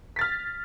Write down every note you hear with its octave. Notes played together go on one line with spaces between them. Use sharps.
F6 A6 B6